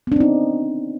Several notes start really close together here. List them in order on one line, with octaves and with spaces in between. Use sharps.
B3 D4 C4 D#4